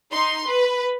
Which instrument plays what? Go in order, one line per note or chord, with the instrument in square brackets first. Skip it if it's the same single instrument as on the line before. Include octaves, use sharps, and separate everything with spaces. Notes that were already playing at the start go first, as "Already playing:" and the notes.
[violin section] D#4 C6
B4